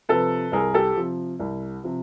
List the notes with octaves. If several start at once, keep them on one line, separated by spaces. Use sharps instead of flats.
C3 F3 A4 B4
C2 G#4 A#4
G4 A4
C3 F3
C2
C3 F3